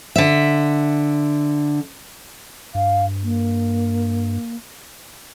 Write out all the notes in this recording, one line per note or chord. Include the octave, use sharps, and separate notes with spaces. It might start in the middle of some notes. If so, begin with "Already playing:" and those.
D3 E5
G2 F5
A#3